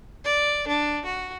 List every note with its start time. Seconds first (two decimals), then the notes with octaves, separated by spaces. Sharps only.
0.24 D5
0.68 D4
1.05 F#4